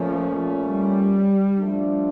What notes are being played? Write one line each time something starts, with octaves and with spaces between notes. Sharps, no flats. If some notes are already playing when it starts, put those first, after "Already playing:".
Already playing: A#2 F3 A3 C#4
G3
F3 A3 D4